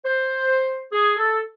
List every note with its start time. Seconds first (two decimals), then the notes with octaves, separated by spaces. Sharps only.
0.05 C5
0.92 G#4
1.18 A4